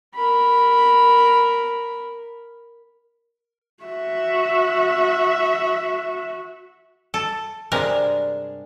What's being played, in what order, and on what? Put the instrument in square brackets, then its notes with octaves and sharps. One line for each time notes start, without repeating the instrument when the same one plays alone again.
[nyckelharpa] A#4 B5
[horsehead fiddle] F#4 E5
[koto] A4
[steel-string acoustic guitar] G2 D4 G#4 [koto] C3 G#3 A#4